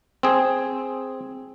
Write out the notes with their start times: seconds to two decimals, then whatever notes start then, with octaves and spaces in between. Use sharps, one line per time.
0.23 C4 G#4